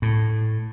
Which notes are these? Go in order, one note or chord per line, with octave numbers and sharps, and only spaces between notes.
A2